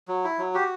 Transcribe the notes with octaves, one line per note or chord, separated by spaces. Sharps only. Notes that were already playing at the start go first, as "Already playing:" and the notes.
F#3
E4
F#3
F#4 G4